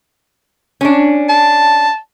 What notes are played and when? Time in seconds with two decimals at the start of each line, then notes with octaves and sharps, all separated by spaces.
0.81 C#4 D4
1.29 A5